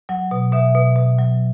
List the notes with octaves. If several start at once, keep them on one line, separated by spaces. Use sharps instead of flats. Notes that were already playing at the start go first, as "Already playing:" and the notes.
F#3 F#5
B2
B2 E5
B2
B2
F#3